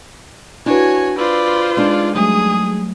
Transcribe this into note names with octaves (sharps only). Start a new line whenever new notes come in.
D4 E4 F#4 B4 C#5 G#5
F4 B4 C5 D5 E6
G#3 D4 D#4 D5
F#3 G3 A3 G#4 D#6